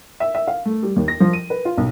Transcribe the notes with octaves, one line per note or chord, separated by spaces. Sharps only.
E5
E5
F5
A3
G3
D#2
A#6
F3
D#7
B4
F4
B1